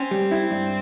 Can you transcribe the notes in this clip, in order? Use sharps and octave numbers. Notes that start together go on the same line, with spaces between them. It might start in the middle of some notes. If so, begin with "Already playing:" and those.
Already playing: C4 C#4
G3
E4
G2